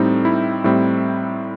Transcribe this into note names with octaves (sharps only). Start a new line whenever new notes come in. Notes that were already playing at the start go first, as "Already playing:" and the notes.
Already playing: A2 G3 C4 D#4 A4 D#5
E4
A2 G3 C4